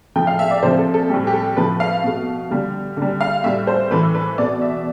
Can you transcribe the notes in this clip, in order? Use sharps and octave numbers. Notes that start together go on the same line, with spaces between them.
A2 F3 A3 G5
F5
E5
D5
C3 F3 A3 C5
A4
A4
A2 G3 G4
G4
A4
A2 F3 A3 B4
F5
B2 A3
D3 G3
D3 G3
F5
A2 G3 E5
C5
A2 E3 A3 B4
B4
B2 A3 D5
E5